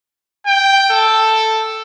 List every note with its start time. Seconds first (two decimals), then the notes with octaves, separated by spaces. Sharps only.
0.46 G5
0.90 A4